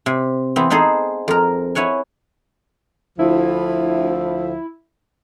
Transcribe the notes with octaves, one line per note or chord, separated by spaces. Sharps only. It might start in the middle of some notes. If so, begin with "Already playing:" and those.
C3
E3 B3 C4
B3 D#4 G#4 A4 C5
F2 A#4
E4 C#5 F#5 G#5
D2 F3 E4